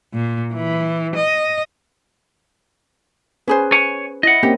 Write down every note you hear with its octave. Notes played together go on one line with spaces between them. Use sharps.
A#2
E3
D#5
C#4 G#4 B4 C5
C#5 G#5
E4 D#5 F#5
A#3 C4 C#4 G4